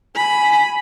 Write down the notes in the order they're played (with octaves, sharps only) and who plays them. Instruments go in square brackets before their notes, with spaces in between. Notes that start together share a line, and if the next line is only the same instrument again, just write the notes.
[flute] G#5 [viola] B5